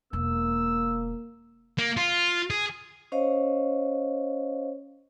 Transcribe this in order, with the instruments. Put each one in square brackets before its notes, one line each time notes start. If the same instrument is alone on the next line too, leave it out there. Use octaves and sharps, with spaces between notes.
[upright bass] E1 [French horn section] A#3 [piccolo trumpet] E6
[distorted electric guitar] A#3
F4
G#4
[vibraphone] C#4 C5 C#5 D#5 F5